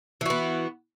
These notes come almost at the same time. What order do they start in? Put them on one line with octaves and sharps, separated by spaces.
E3 F#4 B3